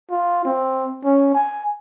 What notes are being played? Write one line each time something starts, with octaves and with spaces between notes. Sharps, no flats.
F4
C4
C#4
G#5